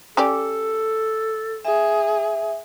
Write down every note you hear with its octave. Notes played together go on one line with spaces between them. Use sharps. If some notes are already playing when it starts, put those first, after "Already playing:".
C#4 G4 A4 D5
G#4 E5